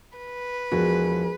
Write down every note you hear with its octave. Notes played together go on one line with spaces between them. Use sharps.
B4
E1 F3 F#4 G#4 G#5